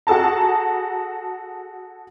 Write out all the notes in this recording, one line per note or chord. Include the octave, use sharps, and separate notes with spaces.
F#4 G#4 A4 A5 A#5